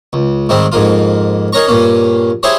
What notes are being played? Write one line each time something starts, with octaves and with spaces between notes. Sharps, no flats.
C#2
G#2 D#3 G3 C4
F2 G#2 A#3 F4
D#4 G#4 A#4 C#5 A#5 C#6
G2 A#2 A#3 C#4
E4 G4 G#4 C5 C#5